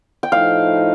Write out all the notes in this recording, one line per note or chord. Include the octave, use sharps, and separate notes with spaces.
G5
A2 F3 A3 D#4 F5